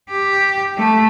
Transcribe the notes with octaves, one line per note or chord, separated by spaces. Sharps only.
G4
A3